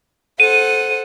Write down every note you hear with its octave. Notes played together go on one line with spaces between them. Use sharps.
A4 C5 F#5 D#7